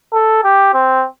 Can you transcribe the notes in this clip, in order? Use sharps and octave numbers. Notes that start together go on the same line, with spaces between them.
A4
G4
C4